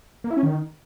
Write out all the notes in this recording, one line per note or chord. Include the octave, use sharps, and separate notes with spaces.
A#3
E4
C#4
D#3